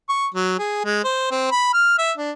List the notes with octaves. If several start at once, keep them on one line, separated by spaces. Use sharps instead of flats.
C#6
F#3
G#4
G#3
C5
C4
B5
F6
E5
D4